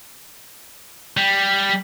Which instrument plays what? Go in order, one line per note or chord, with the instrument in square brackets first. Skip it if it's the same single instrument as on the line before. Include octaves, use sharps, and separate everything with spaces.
[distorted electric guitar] G3